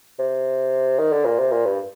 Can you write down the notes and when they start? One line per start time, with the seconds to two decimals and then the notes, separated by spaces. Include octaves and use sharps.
0.19 C3
0.99 D#3
1.12 D3
1.25 A#2
1.39 C3
1.52 A#2
1.65 G2